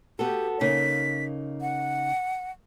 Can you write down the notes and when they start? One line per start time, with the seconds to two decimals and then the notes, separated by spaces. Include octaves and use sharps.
0.19 B3 F#4 G4 A4
0.61 C#3 A#3 D#4 B6
1.61 F#5